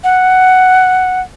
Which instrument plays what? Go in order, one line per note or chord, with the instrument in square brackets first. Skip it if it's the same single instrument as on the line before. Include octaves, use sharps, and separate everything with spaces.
[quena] F#5